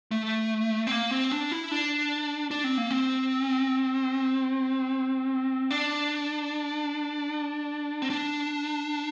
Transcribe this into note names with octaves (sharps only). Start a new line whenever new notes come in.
A3
C4
A#3
C4
D4
E4
D4
D4
C4
A#3
C4
D4
C4
D4